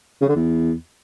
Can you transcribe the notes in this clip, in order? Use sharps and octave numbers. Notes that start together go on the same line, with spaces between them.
C#3
D3
E2